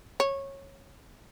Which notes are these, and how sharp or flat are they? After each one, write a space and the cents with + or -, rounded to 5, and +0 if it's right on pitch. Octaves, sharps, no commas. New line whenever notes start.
C#5 -15